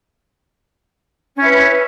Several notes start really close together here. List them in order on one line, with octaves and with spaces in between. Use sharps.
C#4 E4 B4